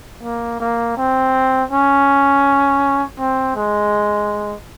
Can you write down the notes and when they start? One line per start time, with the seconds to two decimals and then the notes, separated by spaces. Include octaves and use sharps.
0.23 A#3
0.60 A#3
0.97 C4
1.71 C#4
3.18 C4
3.55 G#3